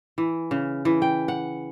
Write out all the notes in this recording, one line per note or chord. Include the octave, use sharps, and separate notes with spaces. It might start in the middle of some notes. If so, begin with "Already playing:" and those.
E3
C#3
E3
G5
F#5